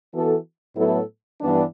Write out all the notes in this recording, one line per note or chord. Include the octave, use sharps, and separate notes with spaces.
E3 B3 F#4 A4
A2 F#3 B3 E4 A4
G2 E3 B3 D4